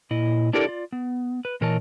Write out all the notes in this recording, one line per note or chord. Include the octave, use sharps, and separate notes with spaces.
A#2 E4 D#5
D4 E4 G4 A4 A#4 D5
F4 D5
B3
B4
A#2 E3 A#4 C#5 D#5 A5